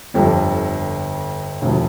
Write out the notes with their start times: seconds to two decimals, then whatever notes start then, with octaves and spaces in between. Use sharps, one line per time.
0.14 G1 F2 D3 G3
1.61 E1 D2 C3 F3